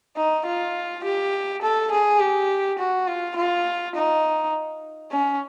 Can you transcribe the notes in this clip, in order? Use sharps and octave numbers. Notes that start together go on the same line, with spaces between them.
D#4
F4
G4
A4
G#4
G4
F#4
F4
F4
D#4
C#4